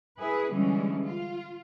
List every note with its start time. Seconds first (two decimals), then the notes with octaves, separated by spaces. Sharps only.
0.19 E4 G#4 B4
0.50 D3 E3 G3 G#3 C#4
1.05 F4